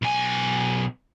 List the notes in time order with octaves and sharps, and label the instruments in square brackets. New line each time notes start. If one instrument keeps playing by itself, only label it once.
[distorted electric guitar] B1 G#5